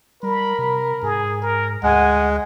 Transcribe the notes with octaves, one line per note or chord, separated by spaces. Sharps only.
G3 A#4 B5
C3
G#2 G#4
A#4
D2 G#3 F#5 G#5